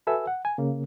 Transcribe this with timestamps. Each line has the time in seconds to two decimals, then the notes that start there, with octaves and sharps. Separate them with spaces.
0.07 F#4 A4 B4 E5 G#5 E6
0.27 F#5
0.45 G#5
0.58 C#3 A#3